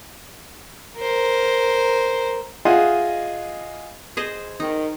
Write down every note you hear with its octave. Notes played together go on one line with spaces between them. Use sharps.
A#4 C5
F4 G#4 D#5 E5 F#5
G#4 C5 D#5
D#3 D#4